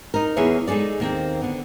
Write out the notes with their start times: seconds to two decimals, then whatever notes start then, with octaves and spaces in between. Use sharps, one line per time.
0.14 D#4 A#4
0.36 E2 A#3 G#4 B4 C#5 E5
0.67 G#3 D#4 G#4 A4 D5
1.00 D#2 A#3 C4
1.41 D3 B3